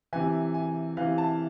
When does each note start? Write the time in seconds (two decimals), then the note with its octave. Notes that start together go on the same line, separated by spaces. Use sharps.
0.13 C3 E3 G#5
0.54 G#5
0.97 C3 E3 F5
1.18 A5